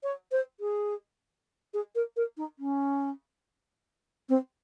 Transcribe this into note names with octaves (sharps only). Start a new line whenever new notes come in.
C#5
C5
G#4
G#4
A#4
A#4
D#4
C#4
C4